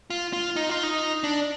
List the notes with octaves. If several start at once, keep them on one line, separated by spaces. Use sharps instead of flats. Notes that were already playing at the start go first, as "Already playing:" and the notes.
F4
F4
D#4
F4
D#4
D4